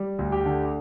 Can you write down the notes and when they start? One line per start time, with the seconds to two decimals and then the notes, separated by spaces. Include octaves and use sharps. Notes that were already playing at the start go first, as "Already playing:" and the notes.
Already playing: G3
0.19 D2
0.32 G4
0.46 D3